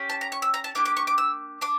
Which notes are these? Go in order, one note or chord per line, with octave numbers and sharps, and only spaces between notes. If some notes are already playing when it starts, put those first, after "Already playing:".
Already playing: C#4 G4
A5
A#5
C#6
E6
A#5
A5
A#3 D4 G4 D6
D6
C#6
D6
E6
D4 D6